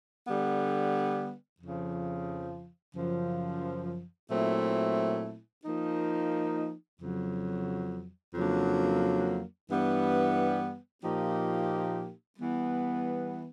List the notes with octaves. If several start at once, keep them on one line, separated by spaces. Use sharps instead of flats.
D3 G3 B3
F2 C#3 F3
F#2 C#3 F3
A#2 F#3 A3 C4 E4
F3 A#3 D#4
F2 C#3 F#3
F2 C#3 F#3 A#3 D4
G2 E3 G3 B3
A#2 F3 A#3 D#4 G4
E3 G3 B3